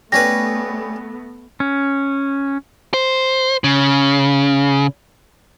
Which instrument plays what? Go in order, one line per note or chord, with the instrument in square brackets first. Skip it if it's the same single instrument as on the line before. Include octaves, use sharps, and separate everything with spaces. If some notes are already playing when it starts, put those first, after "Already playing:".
[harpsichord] G3 C#4 B4 [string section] A3 B3 [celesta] A#6
[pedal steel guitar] C#4
[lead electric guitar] C5
C#3